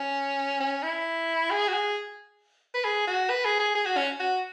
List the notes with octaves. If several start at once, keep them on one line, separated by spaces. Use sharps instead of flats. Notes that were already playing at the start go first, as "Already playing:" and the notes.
Already playing: C#4
C#4
E4
G#4
F#4
G#4
B4
G#4
F#4
B4
G#4
G#4
G#4
F#4
C#4
F#4